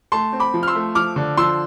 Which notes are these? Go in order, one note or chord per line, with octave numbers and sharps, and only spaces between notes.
A3 A5 C6
C4
B5 D6
F3
F6
C6 E6
A3
F3 D6 F6
D3
F3 C6 E6